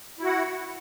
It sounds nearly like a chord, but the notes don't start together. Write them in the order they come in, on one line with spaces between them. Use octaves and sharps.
E4 F#4 F#5